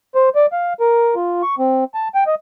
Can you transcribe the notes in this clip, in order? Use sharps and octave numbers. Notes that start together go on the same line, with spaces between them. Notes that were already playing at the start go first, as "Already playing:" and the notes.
C5
D5
F5
A#4
F4
C#6
C4
A5
G5
D#5